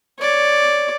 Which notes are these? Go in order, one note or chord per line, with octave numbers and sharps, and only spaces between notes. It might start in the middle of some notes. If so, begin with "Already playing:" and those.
C#5 D5